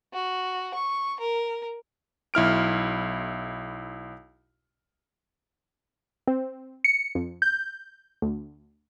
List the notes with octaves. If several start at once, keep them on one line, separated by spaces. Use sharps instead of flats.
F#4
C#6
A#4
B1 E4 F6 D7
C4
C#7
F2
G6
D2